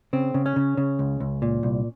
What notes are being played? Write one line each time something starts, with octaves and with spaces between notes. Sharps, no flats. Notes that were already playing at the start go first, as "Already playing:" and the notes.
C#3 C4
C#3
C#4
C#3
C#3
C#2
C#2
A#2
C2